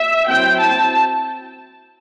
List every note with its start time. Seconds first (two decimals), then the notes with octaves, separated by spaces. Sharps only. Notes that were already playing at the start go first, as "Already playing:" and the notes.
Already playing: E5
0.27 F#3 C4 E4 G5
0.59 A5